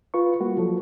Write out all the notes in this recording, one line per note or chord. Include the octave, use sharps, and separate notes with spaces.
F4 B4 C#6
G3 A#3 F#4
F3 F#3 A4